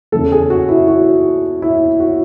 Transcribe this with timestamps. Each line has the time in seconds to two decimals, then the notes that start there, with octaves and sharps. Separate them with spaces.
0.12 E2 C#3 E3 A3 A4
0.32 G#4
0.50 F#4
0.69 E4
0.88 F#4
1.62 E4
2.00 F#4